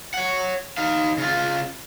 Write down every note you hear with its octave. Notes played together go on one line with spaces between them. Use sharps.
C#5 F#5
D#4 F5
C#3 F4